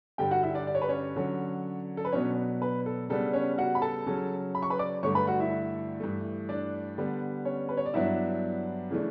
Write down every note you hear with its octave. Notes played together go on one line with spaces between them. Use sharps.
G2 D3 G3 G4 G5
F#4 F#5
E4 E5
D4 D5
D5
C#5
B4
C#4 C#5
D3 F#3 C#4
A4
B4
B2 F#3 B3 C#4 D4 C#5
B4
A4
C#3 G3 B3 D4 A4
C#4 C#5
F#4 F#5
B5
A4 A5
C#3 F#3 C#4
B5
C#6
B4 B5
D5 D6
G2 D3 A3 C#5 C#6
B4 B5
F#4 F#5
E4 E5
G2 E3 A3
D4 D5
D3 G3 B3
C#4 C#5
B4
C#5
D5
G2 F#3 B3 D4 E4 E5
C#3 E3 A3 D4